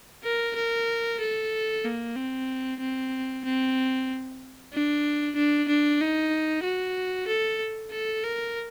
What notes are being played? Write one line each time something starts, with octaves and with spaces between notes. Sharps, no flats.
A#4
A#4
A4
A#3
C4
C4
C4
D4
D4
D4
D#4
F#4
A4
A4
A#4